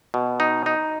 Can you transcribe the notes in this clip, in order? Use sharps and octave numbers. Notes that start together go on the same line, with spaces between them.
B2
D#4
D#4